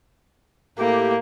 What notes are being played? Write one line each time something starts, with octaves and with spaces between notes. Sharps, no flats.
A2 A#3 G4